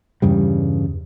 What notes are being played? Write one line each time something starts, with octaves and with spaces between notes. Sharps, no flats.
E2 G2 C#3 G3